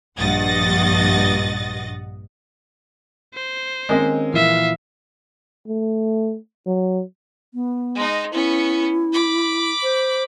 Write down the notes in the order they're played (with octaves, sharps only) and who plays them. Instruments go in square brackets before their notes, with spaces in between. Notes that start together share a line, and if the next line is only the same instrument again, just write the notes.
[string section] A#1 G2 D#5 F#5 A6 A#6
[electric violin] C5
[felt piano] D#3 C4 C#4 [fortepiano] G#3 A#3 D#5
[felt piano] A#2 E3 F3 [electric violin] E5 F5
[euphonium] A3
F#3
[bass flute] B3
[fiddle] G#3 D#4
[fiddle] B3 C#4 [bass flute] E4
[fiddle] B5 D6
[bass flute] C5